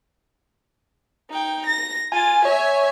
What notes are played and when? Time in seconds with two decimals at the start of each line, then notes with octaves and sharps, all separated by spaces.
1.30 D#4 G5
1.67 A#6
2.12 F4 G#5 A6
2.45 C#5 E5 G#5